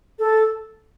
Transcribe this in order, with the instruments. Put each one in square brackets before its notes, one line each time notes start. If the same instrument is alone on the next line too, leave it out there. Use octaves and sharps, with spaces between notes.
[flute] A4